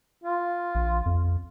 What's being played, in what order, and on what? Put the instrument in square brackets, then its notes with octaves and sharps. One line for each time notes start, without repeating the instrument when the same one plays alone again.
[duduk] F4
[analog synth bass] A#1
F2